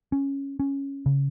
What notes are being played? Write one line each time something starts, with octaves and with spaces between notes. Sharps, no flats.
C#4
C#4
C#3